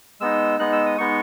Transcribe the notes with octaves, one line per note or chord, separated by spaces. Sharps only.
G#3 B3 D#4 E6
G#3 B3 D#4 F#6
E6
D#6
G#3 B3 D#4 C#6